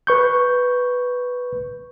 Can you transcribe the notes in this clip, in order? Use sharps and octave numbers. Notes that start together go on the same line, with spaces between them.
B4 C#6 G6